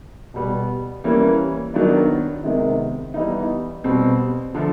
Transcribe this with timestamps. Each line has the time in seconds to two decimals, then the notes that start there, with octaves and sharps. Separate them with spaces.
0.34 B2 G3 B3
1.04 E3 G3 A#3 C#4
1.74 D#3 F#3 B3 D4
2.44 C3 D#3 G#3 B3
3.14 E3 G3 B3 D#4
3.84 B2 G3 C4
4.54 D3 F3 A3